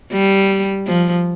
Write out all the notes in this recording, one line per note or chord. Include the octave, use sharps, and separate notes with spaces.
G3
F3